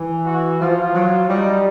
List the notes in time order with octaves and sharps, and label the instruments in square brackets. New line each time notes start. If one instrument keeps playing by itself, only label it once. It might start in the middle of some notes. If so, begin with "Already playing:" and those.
Already playing: [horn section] E3
[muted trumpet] F#4
[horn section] F3 [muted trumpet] F4
[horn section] F#3
[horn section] G3 [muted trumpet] D#4